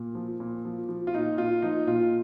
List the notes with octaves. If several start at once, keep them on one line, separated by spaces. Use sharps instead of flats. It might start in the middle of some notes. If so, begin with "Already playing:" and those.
Already playing: A#2
F3
A#2
F3
F3
F4
A#2 D#4
A#2 F4
F3 D#4
A#2 F4